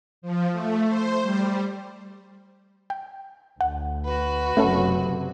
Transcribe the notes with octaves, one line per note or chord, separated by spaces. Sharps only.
F3
A3
C5
G3
G5
D2 F#5
F#4 B4
F#1 C3 F#3 A3 C#4 A4